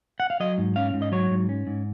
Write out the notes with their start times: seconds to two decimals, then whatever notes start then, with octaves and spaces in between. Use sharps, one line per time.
0.20 F#5
0.30 F5
0.40 F#3 D#5
0.58 G#2
0.76 C#4 F5
0.94 G#2
1.02 D#5
1.12 F#3 C#5
1.31 G#2
1.49 C#4
1.67 G#2